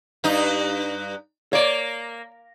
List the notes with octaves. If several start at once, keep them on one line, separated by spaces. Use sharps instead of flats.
G2 D#4
A#3 C#5 D5